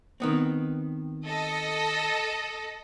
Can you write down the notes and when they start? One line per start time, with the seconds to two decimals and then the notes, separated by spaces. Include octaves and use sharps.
0.20 D#3 B3 C4
1.27 A4 D#5